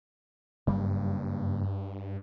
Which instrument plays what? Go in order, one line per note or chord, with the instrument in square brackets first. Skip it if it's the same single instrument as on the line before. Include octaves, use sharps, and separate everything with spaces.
[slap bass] F#1 G3 A#3 [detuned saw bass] G2